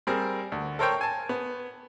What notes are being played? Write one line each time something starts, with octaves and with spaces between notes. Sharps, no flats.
G3 C4 G#4 A#4
D2
A4 A#4 C5 C#5 G5
G#5 A5
B3